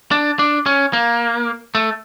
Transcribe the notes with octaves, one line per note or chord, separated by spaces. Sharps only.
D4
D4
C#4
A#3
A3